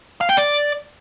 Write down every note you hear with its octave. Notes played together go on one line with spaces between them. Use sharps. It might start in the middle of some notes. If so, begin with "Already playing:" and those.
F5
G5
D5